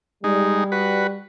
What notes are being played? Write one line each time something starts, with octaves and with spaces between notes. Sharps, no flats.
G3 G#3 D#4
F#4 B4